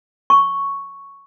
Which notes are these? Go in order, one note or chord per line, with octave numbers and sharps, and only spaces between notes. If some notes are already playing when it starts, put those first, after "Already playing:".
C#6